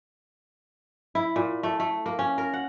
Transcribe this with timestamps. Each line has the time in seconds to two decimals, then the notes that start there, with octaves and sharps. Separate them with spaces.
1.15 E4
1.36 A#2
1.63 A3
1.80 A3
2.06 A#3
2.19 C#4
2.38 A#4
2.53 F#5